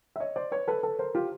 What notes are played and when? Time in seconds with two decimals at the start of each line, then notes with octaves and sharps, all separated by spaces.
0.16 E5
0.20 C#5 D#5
0.36 C5 D5
0.52 B4 C#5
0.68 A4 B4
0.83 A4 B4
0.99 A#4 C5
1.15 F4 G4